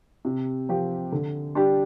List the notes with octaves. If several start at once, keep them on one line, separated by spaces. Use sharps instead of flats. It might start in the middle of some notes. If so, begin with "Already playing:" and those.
C3
F3 C4 G4
D3
G3 D4 G4